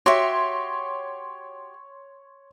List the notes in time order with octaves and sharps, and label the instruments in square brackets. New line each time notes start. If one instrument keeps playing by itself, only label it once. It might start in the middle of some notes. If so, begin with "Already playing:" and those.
[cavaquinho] F#4 G4 E5 [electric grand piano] C#5 C6 C#6